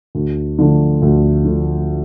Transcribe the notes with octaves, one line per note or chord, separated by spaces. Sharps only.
D2
D3 F3 A3
D2
D3 F3 A3